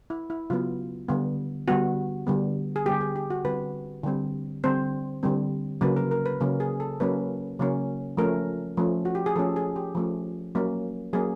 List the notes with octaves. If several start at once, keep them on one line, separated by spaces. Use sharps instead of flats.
E4
E4
C#3 F#3 B3 F4
D3 G3 B3
D3 G3 B3 F#4
D3 G3 B3
G#4
D3 G3 B3 G4
G#4
G4
F#4
D3 G3 C4 B4
D3 G3 C4
D3 G3 C4 C5
D3 G3 C4
C#3 F#3 A#3 C#4 B4
A#4
A#4
B4
C#3 F#3 A#3 C#4 A#4
G#4
A4
C#3 F#3 A#3 C#4 B4
C#3 F#3 A#3 C#4
F3 A3 C#4 A#4
F3 A3 C#4
F#4
G4
G#4
F3 A3 C#4 A4
G#4
G4
F3 A3 C#4
F#3 A#3 C#4
F#3 A#3 C#4 G#4